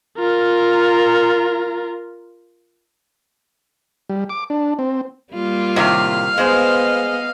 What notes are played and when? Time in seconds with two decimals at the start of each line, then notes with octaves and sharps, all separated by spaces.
0.18 F4 A#4
4.09 G3
4.30 D6
4.50 D4
4.79 C4
5.33 G3 A#3 F4
5.76 A2 C3 D#3 F5
6.38 G#3 B3 C5 D#5